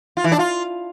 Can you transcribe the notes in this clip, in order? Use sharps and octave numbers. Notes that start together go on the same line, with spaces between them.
F4
E3
D4
F4